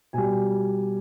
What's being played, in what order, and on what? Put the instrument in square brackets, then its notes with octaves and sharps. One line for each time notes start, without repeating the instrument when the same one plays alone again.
[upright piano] B2 G3 G#5